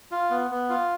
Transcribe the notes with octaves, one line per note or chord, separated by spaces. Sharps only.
F4
B3
B3
F4